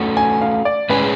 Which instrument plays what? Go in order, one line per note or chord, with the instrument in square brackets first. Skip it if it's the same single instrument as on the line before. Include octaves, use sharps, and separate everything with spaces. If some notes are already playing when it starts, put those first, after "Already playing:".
Already playing: [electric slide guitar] A3 C#4 F#4
[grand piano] G#5
F5
D5
[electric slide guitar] A2 G#3 C#4 G#4 [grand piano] B4